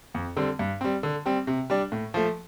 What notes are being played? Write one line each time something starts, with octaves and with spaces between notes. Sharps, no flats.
F2
D3 G3 C4
G2
G3 C4
D3
G3 C4
C3
G3 D4
A2
F3 A3